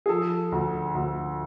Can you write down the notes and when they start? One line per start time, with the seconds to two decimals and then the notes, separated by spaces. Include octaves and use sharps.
0.06 G#4
0.09 F3 A4
0.52 D2
0.94 D2